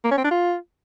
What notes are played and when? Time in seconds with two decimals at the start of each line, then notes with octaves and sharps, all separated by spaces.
0.04 A#3
0.11 C#4
0.18 C4
0.24 D4
0.31 F4